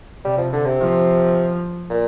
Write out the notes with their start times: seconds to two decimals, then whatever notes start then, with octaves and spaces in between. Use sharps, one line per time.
0.24 C3 G3
0.38 F3
0.52 D3
0.66 C3
0.80 F3
1.90 A#2